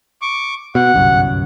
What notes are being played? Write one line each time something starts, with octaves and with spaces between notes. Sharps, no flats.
C#6 D6
B2 F#5
G1 C2 F#2